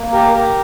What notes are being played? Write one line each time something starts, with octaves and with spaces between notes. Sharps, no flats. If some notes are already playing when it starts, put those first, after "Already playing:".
Already playing: A#3
G4 A#4
G4 A#4